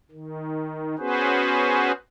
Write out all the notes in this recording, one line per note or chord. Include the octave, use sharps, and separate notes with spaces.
D#3
B3 C#4 F#4 G#4 B4 C5